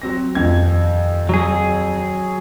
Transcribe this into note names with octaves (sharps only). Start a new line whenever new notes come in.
F#3 C4 A#6
D#1 F2 G#6
F#3 G#4